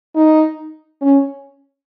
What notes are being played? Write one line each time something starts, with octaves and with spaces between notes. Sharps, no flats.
D#4
C#4